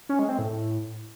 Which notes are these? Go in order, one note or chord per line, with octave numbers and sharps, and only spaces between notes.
C#4
G#3
C4
A2